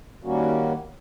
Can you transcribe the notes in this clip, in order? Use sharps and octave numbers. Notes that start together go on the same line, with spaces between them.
D#3 G3 A#3 C#4 F#4